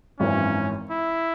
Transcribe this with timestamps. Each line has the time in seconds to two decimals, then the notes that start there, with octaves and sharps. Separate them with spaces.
0.20 G#1 F#2 E3 C#4
0.90 E4